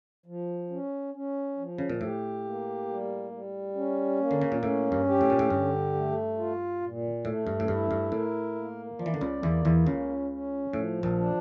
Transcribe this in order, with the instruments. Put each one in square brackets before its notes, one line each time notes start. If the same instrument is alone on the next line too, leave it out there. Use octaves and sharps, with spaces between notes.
[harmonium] F3
C#4
C#4
F3
[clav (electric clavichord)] C#3
A#2
[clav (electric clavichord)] A2 [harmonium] G4
[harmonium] A#3
G3
G3
C#4
A#3
[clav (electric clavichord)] D3
C#3
A#2
[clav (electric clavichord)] A2 [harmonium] C#4
[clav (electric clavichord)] G2
[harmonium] G4
[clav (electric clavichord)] A2
A#2
A2
[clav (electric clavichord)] G2 [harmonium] D3
[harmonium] A3
F4
A#2
[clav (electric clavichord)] A2 [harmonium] A3
[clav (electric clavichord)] G2
A2
[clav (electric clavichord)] G2 [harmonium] E4
[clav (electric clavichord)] G2
[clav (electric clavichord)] A2 [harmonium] A#4
[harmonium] A#3
[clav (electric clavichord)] F3 [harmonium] D5
[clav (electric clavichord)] E3
D3
C#2 C#3
[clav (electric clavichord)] E2 E3 [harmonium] A#3
[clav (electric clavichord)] E2 E3
[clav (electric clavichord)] C#2 C#3 [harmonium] C#4
[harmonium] C#4
[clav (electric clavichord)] A2 [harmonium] F3
[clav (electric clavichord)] A#1 A#2
[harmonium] D4